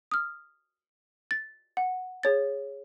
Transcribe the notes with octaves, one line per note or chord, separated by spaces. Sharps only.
D#6 F6
A6
F#5
G#4 C#5 A6